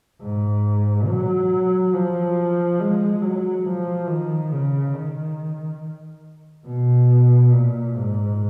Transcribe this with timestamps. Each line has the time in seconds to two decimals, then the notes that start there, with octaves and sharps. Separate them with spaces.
0.21 G#2
1.08 F#3
1.94 F3
2.80 G#3
3.22 F#3
3.65 F3
4.08 D#3
4.52 C#3
4.94 D#3
6.66 B2
7.52 A#2
7.95 G#2